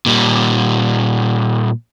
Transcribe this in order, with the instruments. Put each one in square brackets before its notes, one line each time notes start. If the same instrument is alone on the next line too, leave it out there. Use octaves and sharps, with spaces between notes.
[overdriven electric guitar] A#2 G3